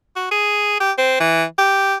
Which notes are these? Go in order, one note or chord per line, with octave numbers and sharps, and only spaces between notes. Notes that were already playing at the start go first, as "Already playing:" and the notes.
F#4
G#4
G4
C4
E3
G4